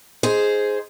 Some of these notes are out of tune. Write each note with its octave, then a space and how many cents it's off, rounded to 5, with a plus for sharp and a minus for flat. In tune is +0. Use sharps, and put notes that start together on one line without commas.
D#4 +0 G#4 +5 C5 +0